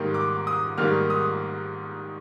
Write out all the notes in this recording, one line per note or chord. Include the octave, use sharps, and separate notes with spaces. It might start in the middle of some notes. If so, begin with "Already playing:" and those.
Already playing: G#2 D#3 G3 A#3
D6
D#6
G#2 D#3 G3 A#3 F6
D#6